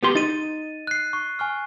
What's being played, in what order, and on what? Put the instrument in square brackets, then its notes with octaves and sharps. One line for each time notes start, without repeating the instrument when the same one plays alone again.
[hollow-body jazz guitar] B3 G4 C6
[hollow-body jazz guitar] D#4 [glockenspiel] A6 D#7
[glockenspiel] F#6 C7
C#6
G#5 C#6 F6